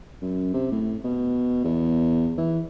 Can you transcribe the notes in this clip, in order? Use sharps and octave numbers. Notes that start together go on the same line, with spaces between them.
F#2
C3
A2
B2
E2
E3